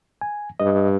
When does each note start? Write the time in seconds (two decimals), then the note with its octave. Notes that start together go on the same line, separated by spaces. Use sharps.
0.21 G#5
0.60 G2 D#5